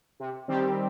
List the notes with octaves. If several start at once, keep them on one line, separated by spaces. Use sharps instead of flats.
C3
D#3 G3 C4 G4